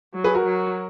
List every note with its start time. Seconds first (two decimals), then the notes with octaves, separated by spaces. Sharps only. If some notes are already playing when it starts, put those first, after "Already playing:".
0.14 F#3
0.24 G#4 B4
0.35 F#4 A#4
0.45 F#3